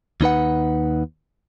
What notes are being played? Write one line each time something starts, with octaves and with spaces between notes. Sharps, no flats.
D#2 D#4 B4 F#5